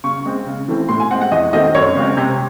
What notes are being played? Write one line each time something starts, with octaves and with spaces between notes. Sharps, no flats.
C#3 C#6
G#3 C4
C#3
E3 A3 C4
A2 C6
G#5
G#3 C4 F#5
F#5
E2 D#5
D#3 A3 C4 D#5
F#2 C#5
C#3 G#3 C4
C3